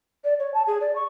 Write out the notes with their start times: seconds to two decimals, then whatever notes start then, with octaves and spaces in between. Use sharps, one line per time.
0.24 D5
0.39 C#5
0.54 A5
0.67 G#4
0.81 D5
0.96 C#6